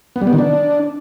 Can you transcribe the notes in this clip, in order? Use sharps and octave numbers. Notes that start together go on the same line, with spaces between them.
B3
G3
B3
D#3
D4